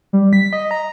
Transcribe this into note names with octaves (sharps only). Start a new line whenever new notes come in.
G3
B6
D#5
A#5